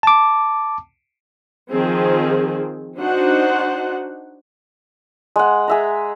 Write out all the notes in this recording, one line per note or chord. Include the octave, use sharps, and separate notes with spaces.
A5 D6
D#3 F3 C4 G#4
D4 D#4 F#4 C5 F#5
G#3 F#5
G#4 E5 A#5